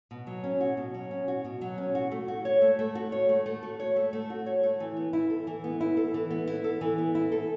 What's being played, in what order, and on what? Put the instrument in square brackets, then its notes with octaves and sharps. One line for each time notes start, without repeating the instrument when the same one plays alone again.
[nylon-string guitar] B2
F#3
C#4
F#4
B2
F#3
C#4
F#4
B2
F#3
C#4
F#4
A3
F#4
C#5
A3
A3
F#4
C#5
A3
A3
F#4
C#5
A3
A3
F#4
C#5
A3
E3
B3
E4
A4
E3
B3
E4
A4
E3
B3
E4
A4
E3
B3
E4
A4